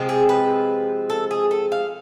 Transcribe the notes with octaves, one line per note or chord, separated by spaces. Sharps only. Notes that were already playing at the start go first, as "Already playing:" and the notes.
Already playing: C3 F3 G#3 C4
G#4
B4
A4
G#4
A4
F5